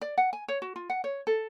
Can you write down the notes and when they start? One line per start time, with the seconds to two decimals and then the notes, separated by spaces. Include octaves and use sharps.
0.02 D5
0.18 F#5
0.33 G#5
0.48 C#5
0.62 F#4
0.76 F4
0.90 F#5
1.04 C#5
1.27 A4